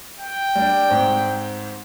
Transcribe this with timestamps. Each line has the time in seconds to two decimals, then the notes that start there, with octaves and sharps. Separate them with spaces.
0.20 G5
0.55 G3 D4
0.90 G#2 C4